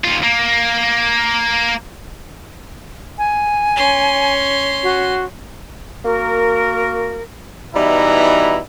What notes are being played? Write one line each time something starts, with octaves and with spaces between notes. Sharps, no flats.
D#2 F4
A#3
G#5
C#4 C6
F#4
A#3 F#4 A#4
B2 E3 G3 D#4 E4 A#5